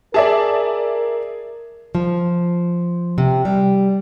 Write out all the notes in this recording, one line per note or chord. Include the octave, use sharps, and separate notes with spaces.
G#4 A#4 D5 E5 A5
F3
C3
G3